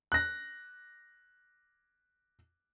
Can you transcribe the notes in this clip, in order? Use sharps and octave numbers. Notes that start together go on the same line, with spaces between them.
F#6 A#6